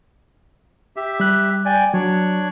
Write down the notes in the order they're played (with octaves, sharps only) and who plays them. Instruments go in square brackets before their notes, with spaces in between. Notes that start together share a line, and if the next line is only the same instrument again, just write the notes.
[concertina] G4 E5
[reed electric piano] G3 F#6
[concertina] D5 G5 G#5
[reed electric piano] F#3 [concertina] D4 C#5